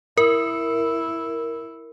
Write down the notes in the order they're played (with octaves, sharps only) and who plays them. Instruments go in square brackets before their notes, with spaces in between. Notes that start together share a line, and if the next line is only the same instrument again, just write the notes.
[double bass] E4 [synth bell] A#4